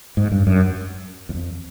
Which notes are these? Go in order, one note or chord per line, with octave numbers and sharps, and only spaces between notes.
G#2
G2
F#2
E2
F2